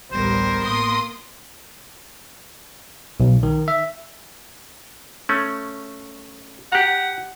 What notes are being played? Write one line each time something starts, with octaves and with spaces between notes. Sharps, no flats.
A1 D2 G3 B3 A#4 C5
A2 A#3 C6 D#6
B1
D#3
E5
A3 C#4
G4 F#5 A#5